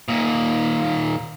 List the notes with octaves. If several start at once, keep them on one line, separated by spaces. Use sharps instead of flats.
D#2 A#2